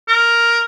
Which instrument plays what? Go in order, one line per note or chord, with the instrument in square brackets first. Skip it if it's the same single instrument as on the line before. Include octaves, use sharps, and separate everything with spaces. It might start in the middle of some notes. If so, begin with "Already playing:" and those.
[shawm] A#4